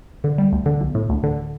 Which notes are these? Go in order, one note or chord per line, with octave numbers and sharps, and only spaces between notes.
D3
G3
D2
D3
B1
A2
D2
D3